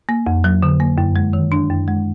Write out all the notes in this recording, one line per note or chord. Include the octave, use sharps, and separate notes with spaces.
A#3
F2
F#3
D3
A#3
F#2
G#3
D#3
D4
F#2
G#3